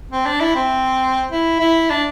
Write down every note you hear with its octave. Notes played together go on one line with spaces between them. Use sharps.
C4
D4
E4
C4
E4
E4
D4